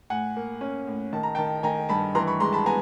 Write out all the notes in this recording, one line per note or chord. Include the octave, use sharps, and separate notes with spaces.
A2 F#5 G#5
A#3
C#4
A2
D#3 A5
A#5
D#3 G5 A5
D#3 G#5 A#5
G2 A5 B5
E3 A#5 C6
B5 C#6
G#3 A#5 C6
A5 B5
B3 G#5 A#5